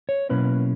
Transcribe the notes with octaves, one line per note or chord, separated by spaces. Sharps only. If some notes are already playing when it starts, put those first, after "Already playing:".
C#5
B2 F#3 A#3 C#4 E4 B4